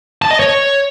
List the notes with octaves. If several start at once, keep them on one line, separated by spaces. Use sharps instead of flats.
A5
D#5
C#5